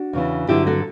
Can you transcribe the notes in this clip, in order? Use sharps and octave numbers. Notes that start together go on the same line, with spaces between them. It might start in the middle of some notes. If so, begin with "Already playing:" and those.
Already playing: D4 F#4
E2 C#3 E3
G2 D3 F#3 E4 G4
F#4 A4